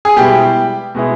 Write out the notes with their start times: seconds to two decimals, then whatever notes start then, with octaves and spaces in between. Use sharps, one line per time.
0.05 G#4
0.16 B2 G3 G#3 B3 E4 G4
0.95 B2 G#3 B3 E4